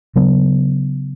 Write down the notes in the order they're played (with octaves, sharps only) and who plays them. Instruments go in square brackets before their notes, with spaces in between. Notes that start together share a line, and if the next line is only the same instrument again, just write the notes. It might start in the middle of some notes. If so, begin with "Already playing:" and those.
[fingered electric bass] C#3 F#3 B3